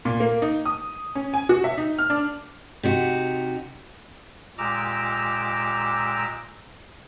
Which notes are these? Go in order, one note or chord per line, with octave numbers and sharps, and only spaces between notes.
A#2
A#3
D#4
D#6
C#4
G#5
F#4
E5
D#4
F6
D4
C3 D#4 F#4
A#2 G#3 G4 A#5 D6 E6